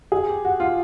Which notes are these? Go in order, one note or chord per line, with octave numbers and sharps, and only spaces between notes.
G#4
G4
F#4
F4